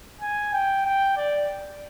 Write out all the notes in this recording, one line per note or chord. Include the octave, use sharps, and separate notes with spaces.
G#5
G5
G5
D5